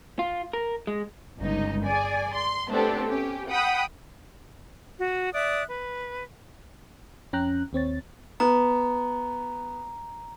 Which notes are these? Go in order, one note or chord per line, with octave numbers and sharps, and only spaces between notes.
F4
A#4
G#3
G1 C#2 D#4
G#4 D5 G#5
C6
A3 B3 C4 D4 G4 A4
C#4 G4
F#5 G5 B5 D#6
F#4
D5 E5 D#6 F#6
B4
F2 C#4 G5 A#5 F#6
D#2 C4 C#5 A6
B3 A#5